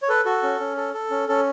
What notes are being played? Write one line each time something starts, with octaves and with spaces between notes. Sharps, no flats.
C#5
A4 B4
F#4 A4
C#4
C#4
A4
A4
C#4
C#4 A4